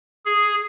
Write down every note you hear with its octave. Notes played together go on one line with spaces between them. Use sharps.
G#4